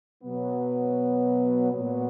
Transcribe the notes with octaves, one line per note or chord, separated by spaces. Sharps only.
B2 F#3 B3
A#2 F#3 B3